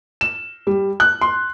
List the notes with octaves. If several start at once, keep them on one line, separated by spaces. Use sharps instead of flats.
E7
G3
F#6
C6